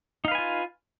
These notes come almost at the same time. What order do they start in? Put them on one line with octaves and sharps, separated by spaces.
D#4 F5 B4 G#5 F4